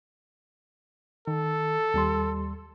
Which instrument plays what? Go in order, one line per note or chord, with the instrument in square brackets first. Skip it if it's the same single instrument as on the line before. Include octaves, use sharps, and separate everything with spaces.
[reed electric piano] D#3 [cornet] A4
[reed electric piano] D#2 G3 C6